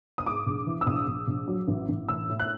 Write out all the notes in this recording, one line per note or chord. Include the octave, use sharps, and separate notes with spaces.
D#6
G#2 D6
A#1
E3
E6
A#1 D#6
A#1
A#1
F#3
A1
A1
A2 E6
A2
F#6